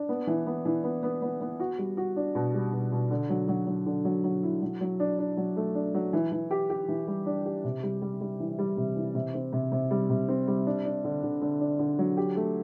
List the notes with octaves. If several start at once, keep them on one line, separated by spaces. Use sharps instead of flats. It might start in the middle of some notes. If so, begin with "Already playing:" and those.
Already playing: D4
B3
E3
B3
E3
B3
B3
B3
B3
F#4
G3
F#4
D4
B2
G3
B2
B2
D3
F#3
F#3
F#3
D3
F#3
F#3
E4
F#3
F#3
D4
D4
F#3
A3
D4
F#3
E3
E3
G4
G4
E3
G3
D4
G4
C3
G3
G3
G3
E3
G3
C3
E3
C3
C4
C3
C3
G3
C3
C4
G3
D4
D4
D3
D3
D3
D4
D3
F#3
G4
A3